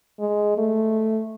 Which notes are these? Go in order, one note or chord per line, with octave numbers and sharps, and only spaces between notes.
G#3
A3